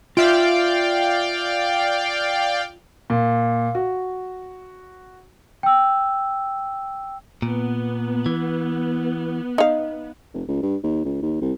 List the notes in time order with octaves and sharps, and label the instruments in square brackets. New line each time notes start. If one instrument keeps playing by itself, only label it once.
[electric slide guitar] F4 E5 [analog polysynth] D5 F5 G5
[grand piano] A#2
F#4
[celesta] G5 E6
[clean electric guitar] A#2 [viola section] B3
[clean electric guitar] E3
[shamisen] D#4 F5
[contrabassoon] F1
C#2
G2
D#2
C#2
D#2
C2